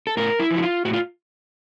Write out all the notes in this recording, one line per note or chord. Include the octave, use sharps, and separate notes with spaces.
A4
A2 A#4
E4
F3
F#4
F4
A2 F#4
F4